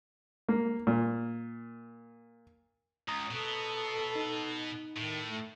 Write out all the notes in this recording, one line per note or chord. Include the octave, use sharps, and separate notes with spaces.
A#3
A#2
C#2 A#5 D#6
B2 B3 A4
D#4
A2 D#3
A3